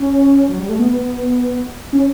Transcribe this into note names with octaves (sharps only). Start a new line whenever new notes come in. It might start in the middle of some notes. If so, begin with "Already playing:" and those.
Already playing: C#4
F#3
G3
A3
B3
C#4